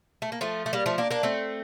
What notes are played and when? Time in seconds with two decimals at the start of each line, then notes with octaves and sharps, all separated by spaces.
0.22 A3
0.32 A#3
0.41 F3 A3
0.66 A3
0.73 G3 A#3
0.86 F3 A3
0.98 A#3 D4
1.11 A#3 D4
1.23 A3 C4